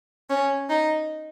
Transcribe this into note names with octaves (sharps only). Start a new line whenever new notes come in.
C#4
D#4